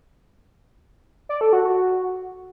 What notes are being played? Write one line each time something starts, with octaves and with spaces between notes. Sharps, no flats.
D5
A4
F#4
F#4